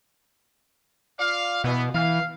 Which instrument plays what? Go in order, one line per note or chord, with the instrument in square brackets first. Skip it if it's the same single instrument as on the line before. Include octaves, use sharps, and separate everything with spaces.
[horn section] F4 D5 F5
[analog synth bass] B2 [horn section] E3 B3
[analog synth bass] E3 [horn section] F5